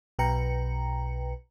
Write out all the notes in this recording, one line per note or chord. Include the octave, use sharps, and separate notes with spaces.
B1 B2 B4 G5 A#5 C#7